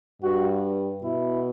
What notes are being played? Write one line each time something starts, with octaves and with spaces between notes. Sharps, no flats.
G2 F#4
B2 E4